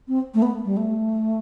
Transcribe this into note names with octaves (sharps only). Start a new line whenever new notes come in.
C4
A3
B3
G3
A3